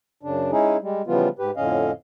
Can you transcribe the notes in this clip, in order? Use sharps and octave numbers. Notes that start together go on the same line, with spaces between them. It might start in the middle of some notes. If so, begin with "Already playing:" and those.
F#2 C#3 D4
G#3 C#4 D#4 E4 G#4
G3 G#3
C#3 E3 F3 G3 B3 F4
G#2 G4 B4
F2 A2 D3 C#4 D#5 F5